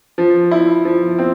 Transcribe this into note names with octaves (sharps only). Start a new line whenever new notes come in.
F3
E4
F3
C4